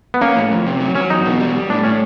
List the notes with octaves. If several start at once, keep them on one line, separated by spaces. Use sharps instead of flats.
B3
A#3 C#4
A2
F2
C3
F#3
F#3 C#4
E2 D#4
B2
G3
G3
A2 D4
A2 C#4